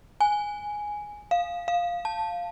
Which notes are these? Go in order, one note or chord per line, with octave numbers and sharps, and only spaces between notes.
G#5
F5
F5
A5